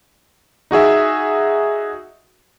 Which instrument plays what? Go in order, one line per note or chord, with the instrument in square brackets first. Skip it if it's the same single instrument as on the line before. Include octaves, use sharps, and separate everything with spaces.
[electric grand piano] D#4 F#4 G#4 E5